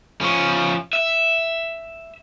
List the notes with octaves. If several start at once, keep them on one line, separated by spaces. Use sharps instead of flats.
F3 C#4
E5